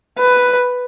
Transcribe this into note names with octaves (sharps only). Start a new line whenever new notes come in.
B4